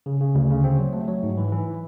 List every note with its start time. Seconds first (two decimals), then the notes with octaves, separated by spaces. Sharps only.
0.06 C#3
0.20 C#3
0.35 D2
0.50 C#3
0.64 C4
0.79 F#3
0.93 A3
1.08 F#3
1.23 G#2
1.37 E3
1.52 E3